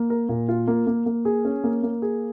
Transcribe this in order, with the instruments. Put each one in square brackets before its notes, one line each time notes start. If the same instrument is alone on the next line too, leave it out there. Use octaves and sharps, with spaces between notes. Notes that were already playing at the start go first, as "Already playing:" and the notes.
Already playing: [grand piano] A#3
A#4
A#2
F4
A#3
A#3
A#3
G#4
C#4
A#3
A#3
G#4